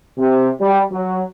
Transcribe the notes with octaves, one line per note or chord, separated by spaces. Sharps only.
C3
G3
F#3